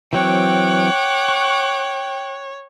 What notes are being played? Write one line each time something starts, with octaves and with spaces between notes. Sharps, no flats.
E3 F#3 C4 C#5 F#5 G5 D6 F#6
C#6